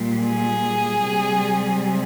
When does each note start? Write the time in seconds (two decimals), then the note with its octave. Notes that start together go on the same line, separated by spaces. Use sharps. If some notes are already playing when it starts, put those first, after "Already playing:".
Already playing: A#2 G3
0.25 G#4
1.07 C3 G3